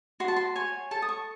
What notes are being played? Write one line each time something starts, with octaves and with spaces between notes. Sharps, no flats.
F#4 C6
A5
C6
C#5 G#5
A4 A5
D#6
C#6